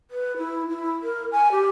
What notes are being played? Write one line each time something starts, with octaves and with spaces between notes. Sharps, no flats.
B4
E4
E4
A#4
G#5
G4